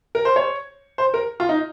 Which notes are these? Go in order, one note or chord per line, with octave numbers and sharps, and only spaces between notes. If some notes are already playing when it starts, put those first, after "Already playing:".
A#4
C5
C#5
C5
A#4
F4
D#4